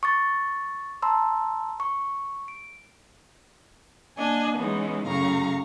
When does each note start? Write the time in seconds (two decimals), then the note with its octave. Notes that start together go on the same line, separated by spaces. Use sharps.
0.03 C#6 D6 A6
1.02 A5 A#5 C6 E6
1.80 C#6
2.48 D7
4.17 A#3 D4 D#5 G#5
4.57 E3 G#3 B3 C#4 D#4
5.06 F#2 A2 C#3 F5 A#5 C#6